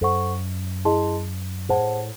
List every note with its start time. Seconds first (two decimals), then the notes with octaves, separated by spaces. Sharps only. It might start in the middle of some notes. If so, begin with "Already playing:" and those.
0.01 F#2 A4 C5 F#5 C#6
0.85 E4 G#4 D#5 A5 C6
1.69 A2 G#4 C5 F#5 A5